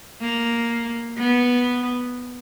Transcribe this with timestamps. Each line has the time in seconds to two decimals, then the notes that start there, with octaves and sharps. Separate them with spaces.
0.21 A#3
1.18 B3